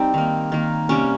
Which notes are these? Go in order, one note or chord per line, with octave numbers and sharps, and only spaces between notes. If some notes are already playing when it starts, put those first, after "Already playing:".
Already playing: G3 C4 D#4 G4
D#3 A#3
D#3 A#3
C3 G3 A#3 C#4